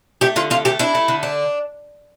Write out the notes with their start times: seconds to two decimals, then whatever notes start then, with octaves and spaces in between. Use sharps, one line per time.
0.21 A3 G4
0.36 D3 F4
0.50 A3 F4
0.65 A3 G4
0.79 D4 E4
0.95 A3
1.08 D3
1.23 D4